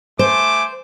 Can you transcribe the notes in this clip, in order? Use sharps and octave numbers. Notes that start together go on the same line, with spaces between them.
A3 C5 G#5 D6